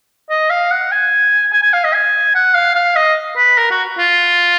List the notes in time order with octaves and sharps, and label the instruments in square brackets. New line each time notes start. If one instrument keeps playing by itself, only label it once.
[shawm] D#5
F5
F#5
G#5
G#5
G#5
F5
D#5
G#5
F#5
F5
F5
D#5
B4
A#4
F#4
F4